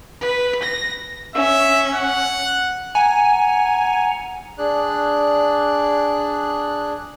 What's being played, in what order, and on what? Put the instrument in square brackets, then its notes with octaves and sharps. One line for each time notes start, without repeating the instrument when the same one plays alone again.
[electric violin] B4
A#6
[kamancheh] C#4 [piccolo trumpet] E5
[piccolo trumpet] F#5
[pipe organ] F#5 A#5 [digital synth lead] G#5
[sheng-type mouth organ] D4 G#4 D5 F#6